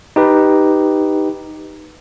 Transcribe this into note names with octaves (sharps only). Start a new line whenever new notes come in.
D#4 G4 B4